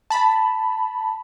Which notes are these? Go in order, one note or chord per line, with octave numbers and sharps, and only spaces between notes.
A5 B5